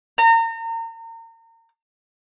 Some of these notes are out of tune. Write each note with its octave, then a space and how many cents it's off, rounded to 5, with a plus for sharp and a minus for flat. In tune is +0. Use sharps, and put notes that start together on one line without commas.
A#5 -35